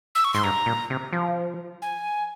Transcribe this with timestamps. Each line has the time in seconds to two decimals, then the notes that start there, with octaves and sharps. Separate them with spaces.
0.15 E6
0.24 C#6
0.34 G#2 C6
0.43 G2 A#5
0.66 A#2
0.90 C3
1.13 F3
1.82 G#5